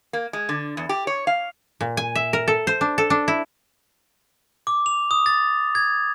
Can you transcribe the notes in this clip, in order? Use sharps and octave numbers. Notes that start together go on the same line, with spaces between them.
A#3
G#3
D3
E2
G4
C#5
F5
A#2
G#5
E5
A#4
A4
C5
D4
A4
D4
E4
D6
F7
D#6
A6
G#6